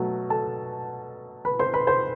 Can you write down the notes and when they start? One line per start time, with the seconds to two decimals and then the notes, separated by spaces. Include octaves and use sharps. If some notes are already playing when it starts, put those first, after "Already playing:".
Already playing: B2 F#3 A3
0.30 A4 A5
1.45 B4 B5
1.59 C5 C6
1.74 B4 B5
1.87 C5 C6